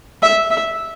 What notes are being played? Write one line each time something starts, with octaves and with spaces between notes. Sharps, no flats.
E5
E5